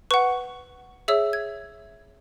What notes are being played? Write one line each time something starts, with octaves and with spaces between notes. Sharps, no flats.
B4 F#5 C#6
G#4 C#5 E5 E6
G#6